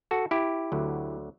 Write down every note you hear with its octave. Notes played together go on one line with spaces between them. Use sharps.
F#4 A4
E4 G4
D2 D3 F#3